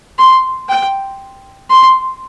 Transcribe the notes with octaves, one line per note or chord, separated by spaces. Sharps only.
C6
G5
C6